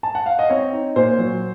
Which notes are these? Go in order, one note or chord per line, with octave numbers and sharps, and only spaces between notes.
A5
F#5
F5
D#5
C4 C#5
D#4
A#2 C5
F#3